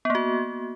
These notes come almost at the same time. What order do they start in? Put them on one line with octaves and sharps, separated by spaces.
B3 A#3 F#4